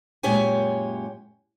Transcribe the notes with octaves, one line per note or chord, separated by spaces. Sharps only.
F#2 A#2 G#3 G4 C#5 G#5